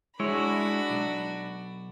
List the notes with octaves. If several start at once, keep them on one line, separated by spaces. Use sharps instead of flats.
G#3 D4 E4 F#4 C#5 B5
B1